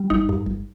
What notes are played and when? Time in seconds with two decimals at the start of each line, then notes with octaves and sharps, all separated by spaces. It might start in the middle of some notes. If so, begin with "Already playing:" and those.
Already playing: G3
0.10 G1 D#4
0.29 G2
0.46 G1